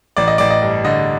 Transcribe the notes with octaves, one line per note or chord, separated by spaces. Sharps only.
A1 D5
D#5
A1 D5
D#5
G2
D3 D#5